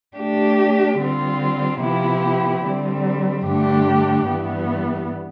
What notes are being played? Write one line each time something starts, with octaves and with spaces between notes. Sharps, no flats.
A3 D4 G4
D3 G3 C4 F4
C3 F3 B3 E4 G4
D3 G3 C4
G2 D3 A3 D4 G4
G2 E3 G3 B3